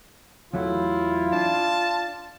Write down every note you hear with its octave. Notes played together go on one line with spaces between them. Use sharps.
E2 F#3 A3 E4 F4
D4 A5